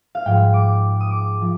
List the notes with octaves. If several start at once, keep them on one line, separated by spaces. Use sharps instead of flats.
F5
G#2 F3 G#3 G5
D6
D#6
D6
F3